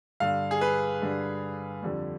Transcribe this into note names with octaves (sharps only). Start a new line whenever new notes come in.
G2 D3 G3 F5
G#4
B4
G2 D3 G3
F2 D3 G3